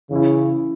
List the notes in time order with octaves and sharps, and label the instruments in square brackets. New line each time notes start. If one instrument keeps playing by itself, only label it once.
[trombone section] C#3 [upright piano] E3 C#4 E4